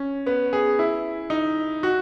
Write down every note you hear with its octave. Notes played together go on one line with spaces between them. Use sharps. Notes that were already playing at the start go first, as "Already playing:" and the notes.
Already playing: C#4
B3
G#4
E4
D#4
F#4